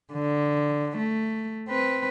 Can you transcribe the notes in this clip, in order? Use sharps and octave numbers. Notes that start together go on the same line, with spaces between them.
D3
A3
C4 B4